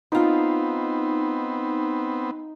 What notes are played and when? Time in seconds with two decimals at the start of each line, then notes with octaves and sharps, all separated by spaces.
0.12 B3 C4 D#4 F4 D5